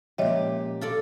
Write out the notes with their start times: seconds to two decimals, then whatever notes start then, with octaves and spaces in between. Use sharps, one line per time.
0.18 A#2 F3 G#3 C#4 G4 C#5 D#5 E5
0.81 F4 A4 D5